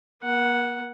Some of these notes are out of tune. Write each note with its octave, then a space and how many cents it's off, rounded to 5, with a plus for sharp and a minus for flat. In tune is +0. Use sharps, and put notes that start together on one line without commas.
A#3 +40 F#5 +0